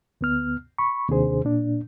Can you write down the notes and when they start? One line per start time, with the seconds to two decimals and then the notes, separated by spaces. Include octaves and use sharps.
0.21 D2 B3 F6
0.78 B5 C#6
1.09 D#2 C3 D4 G#4 C5
1.45 A#2 D4